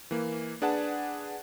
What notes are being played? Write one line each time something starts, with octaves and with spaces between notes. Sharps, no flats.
E3 A#3
D4 G#4 B4 F#5 A5